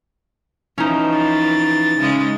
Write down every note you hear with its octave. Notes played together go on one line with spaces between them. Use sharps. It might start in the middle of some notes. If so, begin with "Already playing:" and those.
E3 F3 C#4 D#4
A6
C#3 G#3